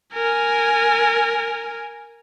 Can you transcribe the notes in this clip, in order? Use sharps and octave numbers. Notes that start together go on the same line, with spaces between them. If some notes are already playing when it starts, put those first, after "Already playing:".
A#4 G#5